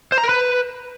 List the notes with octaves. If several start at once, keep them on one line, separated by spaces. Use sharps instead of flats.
C5
A#5
A#4
B4